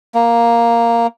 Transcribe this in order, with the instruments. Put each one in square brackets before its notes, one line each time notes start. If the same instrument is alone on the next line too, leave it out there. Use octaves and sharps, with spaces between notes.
[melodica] A#3